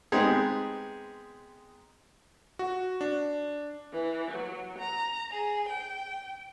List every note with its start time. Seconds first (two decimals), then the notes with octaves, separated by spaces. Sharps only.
0.12 G#3 B3 C4 D#4 G4 G#4
2.59 F#4
3.01 D4
3.92 E3
4.31 F#3
4.79 A#5
5.30 G#4
5.68 G5